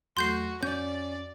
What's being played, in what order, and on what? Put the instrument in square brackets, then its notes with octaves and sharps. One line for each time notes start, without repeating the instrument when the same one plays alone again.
[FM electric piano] E2 F#3 A3 [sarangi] F#4 [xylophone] C6 G6 C7
[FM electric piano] F2 [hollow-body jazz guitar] C#4 [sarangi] D5 [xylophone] G6